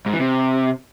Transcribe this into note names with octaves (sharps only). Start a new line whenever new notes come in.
G#2
E3
C3